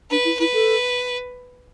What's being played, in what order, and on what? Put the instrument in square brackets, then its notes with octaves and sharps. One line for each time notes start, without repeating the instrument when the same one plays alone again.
[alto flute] D4 [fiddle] B4
[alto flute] E4
[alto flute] E4 [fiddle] B4
[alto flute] A4